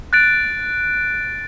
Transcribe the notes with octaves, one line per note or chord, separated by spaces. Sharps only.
F#6 A6 D7